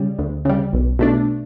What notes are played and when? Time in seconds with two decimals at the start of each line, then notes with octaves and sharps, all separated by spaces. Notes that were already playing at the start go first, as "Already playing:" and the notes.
Already playing: C#3 G3
0.18 D2
0.45 C#3 G3
0.73 B1
0.99 B2 A3 D4